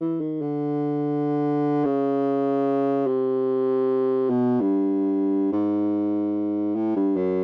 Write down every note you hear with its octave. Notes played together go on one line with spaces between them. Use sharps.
E3
D#3
D3
C#3
C3
B2
G2
G#2
A2
G2
F#2